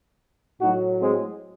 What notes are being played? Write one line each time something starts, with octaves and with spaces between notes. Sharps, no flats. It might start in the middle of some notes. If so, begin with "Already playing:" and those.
A2 F#3 D#4 F#4
G#3 C4